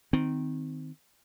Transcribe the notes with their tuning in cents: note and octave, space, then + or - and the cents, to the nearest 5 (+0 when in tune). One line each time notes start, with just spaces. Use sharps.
D#3 +0 C4 -20